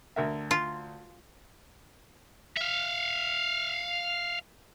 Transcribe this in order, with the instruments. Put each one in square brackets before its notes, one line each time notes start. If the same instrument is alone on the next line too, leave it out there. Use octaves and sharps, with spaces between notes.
[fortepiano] D2 A#4 E5
[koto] F4
[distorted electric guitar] E5 F5